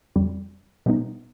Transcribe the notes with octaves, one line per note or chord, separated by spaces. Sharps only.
F2 D3 G3
B2 G3 B3 D#4